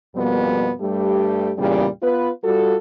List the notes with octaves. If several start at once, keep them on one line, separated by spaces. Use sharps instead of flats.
F2 B2 G3 A#3 B3
G2 G3 A3 G4
E2 A#2 C#3 G3
B3 F4 B4
G3 F4 F#4 A4